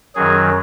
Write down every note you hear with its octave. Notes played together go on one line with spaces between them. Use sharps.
F#2 D#3 F#3 G#4